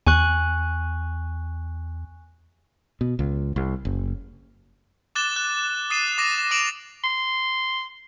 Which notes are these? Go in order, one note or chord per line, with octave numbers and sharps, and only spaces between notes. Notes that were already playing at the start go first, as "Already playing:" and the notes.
E2 G#5 C#6 F#6
B2
C#2
C2
F#1
D6 F#6 A6 E7 G7
F#6
D#6 A6 C7 D#7 E7
D6 A#6 C7 D#7
D6 D7 F7 F#7
C6